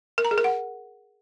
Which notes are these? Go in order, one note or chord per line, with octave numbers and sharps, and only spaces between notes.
A#4
A#5
G#4
A#4
F#5